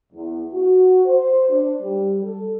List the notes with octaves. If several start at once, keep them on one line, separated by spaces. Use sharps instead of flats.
E2
F#4
C5
D4
G3
A4